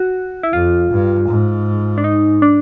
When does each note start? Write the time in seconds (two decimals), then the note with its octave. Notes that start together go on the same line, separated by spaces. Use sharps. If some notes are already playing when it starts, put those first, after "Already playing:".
Already playing: F#4
0.43 E4
0.52 F2 F4
0.91 G2
1.28 G#2
1.98 D4
2.04 D#4
2.42 D4